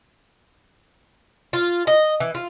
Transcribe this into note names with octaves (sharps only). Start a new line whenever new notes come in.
F4
D#5
E3
F4